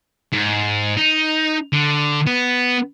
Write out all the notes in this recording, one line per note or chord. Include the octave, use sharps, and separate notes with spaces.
G#2
D#4
D3
B3